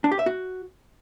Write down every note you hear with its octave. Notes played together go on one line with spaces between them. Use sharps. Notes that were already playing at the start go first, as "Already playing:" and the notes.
D4
G4
E5
F#4